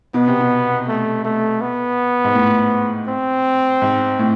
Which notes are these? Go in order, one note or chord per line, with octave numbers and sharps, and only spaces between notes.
B2 B3
C3
B2
A3
A3
B3
G#2
A2
C4
G#2
A2